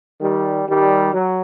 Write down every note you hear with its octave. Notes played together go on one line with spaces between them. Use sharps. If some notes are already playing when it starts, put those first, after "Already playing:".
D#3 G3
D#3 G3
F#3